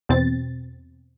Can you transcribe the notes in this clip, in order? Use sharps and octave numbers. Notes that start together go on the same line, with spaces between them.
E2 B2 C4 A6